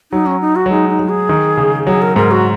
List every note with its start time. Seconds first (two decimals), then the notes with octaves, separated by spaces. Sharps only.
0.12 F#3 D#4
0.26 C#4
0.41 D#4
0.56 F#4
0.66 F#3
0.71 G#3 D#4
0.90 D#4
0.99 F#3
1.09 G#4
1.29 D#3
1.57 C#3
1.87 F#3 G#4
2.02 A#4
2.16 G#2 A#4
2.31 F#4